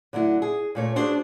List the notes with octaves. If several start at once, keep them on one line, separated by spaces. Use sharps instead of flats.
D3 F#3 A3 E4
G#4
A#2 A3 C#5
D4 F#4 G#4 C5